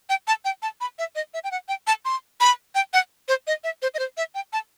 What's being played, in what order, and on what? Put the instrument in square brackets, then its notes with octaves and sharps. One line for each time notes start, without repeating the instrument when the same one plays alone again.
[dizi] G5
A5
G5
A5
B5
E5
D#5
E5
G5
F#5
G5
A5
C6
B5
G5
F#5
C5
D#5
E5
C5
D#5
C5
E5
G5
A5